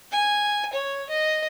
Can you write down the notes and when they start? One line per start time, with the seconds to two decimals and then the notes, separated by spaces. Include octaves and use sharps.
0.12 G#5
0.73 C#5
1.09 D#5